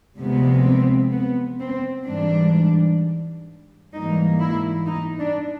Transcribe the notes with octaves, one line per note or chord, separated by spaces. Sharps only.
D2 C3 F3 G#3 B3
C4
B3
C4
G#2 E3 G3 D4
G#2 E3 G3 A#3 D#4
E4
D#4
D4